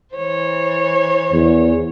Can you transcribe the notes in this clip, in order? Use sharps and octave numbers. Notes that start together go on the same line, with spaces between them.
E3 C5 C#5
E2